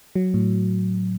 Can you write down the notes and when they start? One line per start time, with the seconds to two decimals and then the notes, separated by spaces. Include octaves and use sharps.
0.16 F#3
0.34 A2